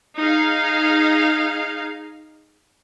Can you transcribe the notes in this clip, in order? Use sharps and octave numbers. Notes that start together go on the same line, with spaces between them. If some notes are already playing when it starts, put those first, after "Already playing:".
D#4 G#4 F5